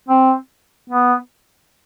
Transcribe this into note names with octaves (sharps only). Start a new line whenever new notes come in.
C4
B3